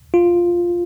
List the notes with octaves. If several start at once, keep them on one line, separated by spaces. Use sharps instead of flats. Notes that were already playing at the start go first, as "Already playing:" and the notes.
F4